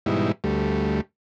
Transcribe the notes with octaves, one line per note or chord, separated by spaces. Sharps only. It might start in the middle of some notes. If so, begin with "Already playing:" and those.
G#2 B2 E3 G3 D#4 E4
D2 G3 A3